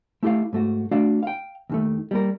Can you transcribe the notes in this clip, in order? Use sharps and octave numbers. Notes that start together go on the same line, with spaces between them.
A3 E4 G4 A4 F5
G#2 A3 F#4
A3 D4 F#4 D5 F5
F5 G5
D#2 D#3 A3
G3 A#3 A#4